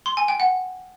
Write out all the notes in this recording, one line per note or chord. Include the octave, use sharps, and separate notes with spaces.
C6
G#5
G5
F#5